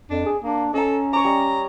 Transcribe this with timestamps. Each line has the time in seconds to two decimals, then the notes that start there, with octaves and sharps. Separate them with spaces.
0.10 F2 D4
0.26 G#4
0.43 A#3 D4
0.74 C#4 A4 D#5 A#5
1.13 C#5 A#5 D6
1.24 G3 D#5